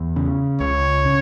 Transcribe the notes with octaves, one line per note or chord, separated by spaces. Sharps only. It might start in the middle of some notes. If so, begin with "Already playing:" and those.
Already playing: E2
C#3
C#2 C#5
C#3